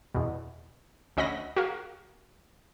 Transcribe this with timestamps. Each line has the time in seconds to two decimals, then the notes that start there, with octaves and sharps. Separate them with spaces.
0.14 E2 B2
1.17 D2 C#4 D#5 F#5 B5 A#6
1.57 F#4 G#4 A#4 F5